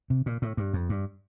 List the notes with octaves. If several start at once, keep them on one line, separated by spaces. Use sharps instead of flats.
C3
A#2
A2
G2
F2
G2